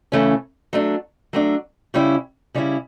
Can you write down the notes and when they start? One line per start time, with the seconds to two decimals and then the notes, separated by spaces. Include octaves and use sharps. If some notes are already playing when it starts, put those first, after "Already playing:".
0.12 C#3 E3 A3 C#4
0.73 F#3 A3 D4
1.33 F#3 A3 D4
1.94 C#3 G3 C#4 E4
2.55 C#3 G3 C#4 E4